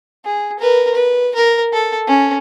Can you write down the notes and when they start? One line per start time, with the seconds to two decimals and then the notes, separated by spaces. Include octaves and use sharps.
0.25 G#4
0.59 A#4 B4
0.94 B4
1.35 A#4
1.73 A4
2.07 C#4